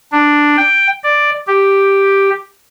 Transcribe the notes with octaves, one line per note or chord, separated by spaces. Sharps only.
D4
G5
D5
G4